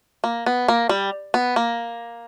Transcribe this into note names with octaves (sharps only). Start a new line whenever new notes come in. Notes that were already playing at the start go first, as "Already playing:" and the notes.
A#3
B3
A#3
G3
B3
A#3